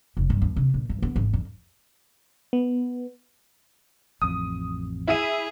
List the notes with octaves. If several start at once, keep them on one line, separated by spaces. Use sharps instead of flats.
F1
G2
D#2
C3
A#2
G2
B3
G#1
F2
B3
A1 F2 D#6
E4 G#4 E5 D#7